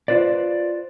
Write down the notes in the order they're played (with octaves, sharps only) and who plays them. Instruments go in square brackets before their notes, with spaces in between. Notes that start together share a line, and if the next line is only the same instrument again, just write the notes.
[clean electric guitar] F4 B4 C5 D5